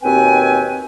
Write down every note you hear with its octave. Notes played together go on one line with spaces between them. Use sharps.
D#2 B2 C4 B4 G5 G#5